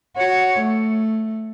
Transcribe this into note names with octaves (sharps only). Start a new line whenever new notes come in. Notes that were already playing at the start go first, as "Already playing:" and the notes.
F#4 C#5
A3